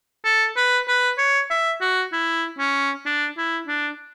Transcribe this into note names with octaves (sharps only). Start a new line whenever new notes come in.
A4
B4
B4
C#5
E5
F#4
E4
C#4
D4
E4
D4